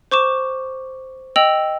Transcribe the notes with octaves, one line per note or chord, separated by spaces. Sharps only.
C5 C#6 D6 E7
D#5 G5 E6 F7 F#7